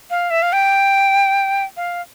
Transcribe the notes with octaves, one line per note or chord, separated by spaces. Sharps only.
F5
E5
F5
G5
F5